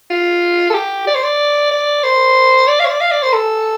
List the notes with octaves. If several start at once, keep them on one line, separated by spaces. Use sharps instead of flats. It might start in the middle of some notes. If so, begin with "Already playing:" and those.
F4
A4
G4
D5
C5
D5
D5
C5
D5
F5
C5
D5
F5
D5
C5
A4